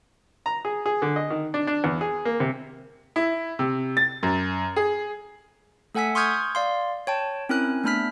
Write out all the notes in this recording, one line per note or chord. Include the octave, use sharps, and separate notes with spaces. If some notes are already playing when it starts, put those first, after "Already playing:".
A#5
G#4
G#4
D3
D#5
D#3
D4
D4
E2
G#4
A#3
C3
E4
C3
A6
F#2
G#4
A3 A4 F#5 G#5 E6 B6
C6 C#6 D#6 F6 G6 G#6
D5 F5 C6
C#5 G5 A5
C4 C#4 E4 A#4 G#5 F#6
A3 B3 D4 B5 F6 B6